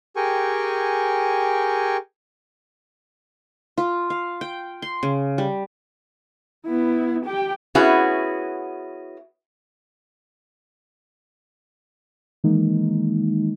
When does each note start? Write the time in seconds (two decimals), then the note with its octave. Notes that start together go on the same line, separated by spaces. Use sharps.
0.16 G4 G#4 A#4 G5 G#5 C#6
3.78 F4
4.10 F5
4.41 G5
4.82 C6
5.03 C#3
5.38 G3
6.66 B3 E4
7.25 G4 G5
7.75 B3 C#4 E4 F#4 G#4
12.44 D#3 E3 G#3 A#3 D#4